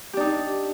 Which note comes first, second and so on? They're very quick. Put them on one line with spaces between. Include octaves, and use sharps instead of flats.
G4 D4 D#4